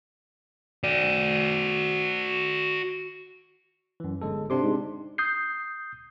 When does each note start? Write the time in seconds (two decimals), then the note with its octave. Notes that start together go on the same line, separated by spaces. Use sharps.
0.84 F#4 D5
4.00 F#2 E3
4.22 G1 G#3 A4
4.50 C3 D4 C6 D6
4.63 G#2
5.18 D#6 G6 C7